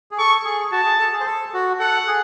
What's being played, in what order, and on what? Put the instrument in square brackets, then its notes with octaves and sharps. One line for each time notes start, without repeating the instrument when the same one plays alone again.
[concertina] G#4
[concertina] A4 [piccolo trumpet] C#6
[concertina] G#4
[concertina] F#4 [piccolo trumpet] A5
[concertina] G#4
A4
G#4
C5
A4
F#4
[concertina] A4 [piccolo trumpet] F#5
[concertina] G#4